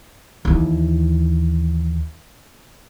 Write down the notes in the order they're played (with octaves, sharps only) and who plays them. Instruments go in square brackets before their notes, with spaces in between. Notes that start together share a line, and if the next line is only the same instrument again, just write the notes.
[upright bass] D#2 E3